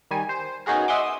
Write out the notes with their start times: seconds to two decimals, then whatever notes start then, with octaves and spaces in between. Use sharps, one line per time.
0.11 D#3 G3 G#5
0.29 C5
0.66 B3 C#4 D#4 F#4 G#4 A#4
0.88 D#5 E5 F#5 G#5 C6 D6
1.04 D#6 E6